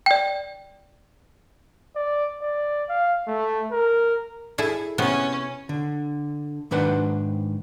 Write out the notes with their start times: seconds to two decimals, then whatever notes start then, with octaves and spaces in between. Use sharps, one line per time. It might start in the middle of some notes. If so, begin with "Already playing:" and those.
0.06 D5 G5
1.96 D5
2.42 D5
2.89 F5
3.28 A3
3.72 A#4
4.58 E4 G#4 A4
4.98 C3 B3 C#4
5.69 D3
6.71 G#2 D#3 D4 B4 C5 F#5